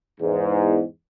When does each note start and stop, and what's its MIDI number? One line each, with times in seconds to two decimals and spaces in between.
0.20 0.82 40
0.20 0.82 44